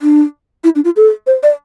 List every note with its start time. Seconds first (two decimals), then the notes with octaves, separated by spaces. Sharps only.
0.02 D4
0.64 E4
0.75 D4
0.85 F4
0.96 A4
1.27 C5
1.43 D5